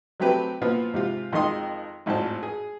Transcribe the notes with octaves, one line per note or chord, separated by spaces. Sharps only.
F#3 A3 C4 G4 B4
A#2 F3 B3 F4
G#2 C3 F4
F2 D#3 G#3 C6 D#6
G#1 F2 A2 C5 A5
G#4